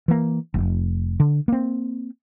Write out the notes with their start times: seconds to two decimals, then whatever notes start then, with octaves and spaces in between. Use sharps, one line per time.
0.08 E3 A#3
0.54 F1
1.20 D3
1.48 A#3 C4